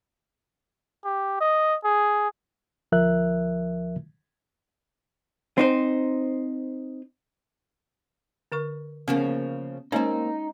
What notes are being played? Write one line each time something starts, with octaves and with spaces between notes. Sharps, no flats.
G4
D#5
G#4
D2 F3 A#4 E5 F#6
C4 D#4 C5
D3 A#4 C#6
C#3 F3 A#3 B3 C#4 F#5
G#3 A#3 C4 C#4 D#4 C#5